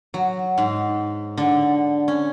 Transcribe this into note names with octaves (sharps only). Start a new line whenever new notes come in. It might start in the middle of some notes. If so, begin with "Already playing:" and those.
F#3
G#2
D3
C#4